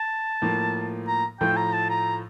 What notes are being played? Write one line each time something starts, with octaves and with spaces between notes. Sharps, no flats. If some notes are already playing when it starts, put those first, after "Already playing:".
Already playing: A5
A2 F3 A#3
A#5
A2 F3 A3 G5
A#5
A5
A#5